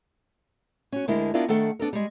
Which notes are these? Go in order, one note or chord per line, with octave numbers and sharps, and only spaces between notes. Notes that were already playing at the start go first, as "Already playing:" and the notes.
C#4 F#4
D2 D3 G#3 D4 E4 A#4
B3 D4 E4 F4 A#4 D5
D#3 A3 D4 A4 F#5
B3 D4 A4 A#4
G3 G#3